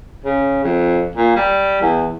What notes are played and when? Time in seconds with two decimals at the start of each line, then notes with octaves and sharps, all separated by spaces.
0.25 C#3
0.64 F2
1.16 A#2
1.36 G3
1.82 E2